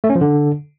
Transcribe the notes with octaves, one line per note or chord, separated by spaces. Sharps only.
A3
C#4
F3
D3